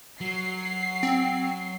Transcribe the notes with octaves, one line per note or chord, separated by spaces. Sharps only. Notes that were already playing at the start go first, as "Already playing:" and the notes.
F#3 C7
C4